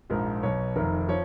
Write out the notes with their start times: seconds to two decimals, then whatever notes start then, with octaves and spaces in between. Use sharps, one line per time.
0.10 A#1 G#2 F3 A#4
0.43 B1 B2 C#5
0.76 F1 F2 D#3 A#4
1.09 F3 C#5